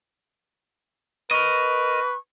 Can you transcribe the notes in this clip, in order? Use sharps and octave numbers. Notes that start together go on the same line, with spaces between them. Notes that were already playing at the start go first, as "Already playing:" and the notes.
A#4 B4 D#5 C#6